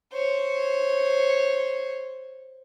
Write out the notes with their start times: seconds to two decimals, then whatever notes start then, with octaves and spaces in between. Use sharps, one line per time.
0.13 C5 C#5